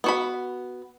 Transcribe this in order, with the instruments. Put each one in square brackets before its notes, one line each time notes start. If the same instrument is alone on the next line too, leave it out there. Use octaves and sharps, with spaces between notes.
[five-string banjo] B3 F#4 B5